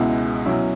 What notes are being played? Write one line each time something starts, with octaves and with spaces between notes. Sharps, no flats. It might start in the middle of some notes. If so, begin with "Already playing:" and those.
Already playing: C#2 B2 G#3 B3 E4
B2 F#3 C#4 E4